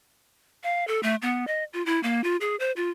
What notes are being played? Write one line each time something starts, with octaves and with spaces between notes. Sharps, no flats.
F5
A4
A3
B3
D#5
F4
E4
A#3
F4
G#4
C5
F4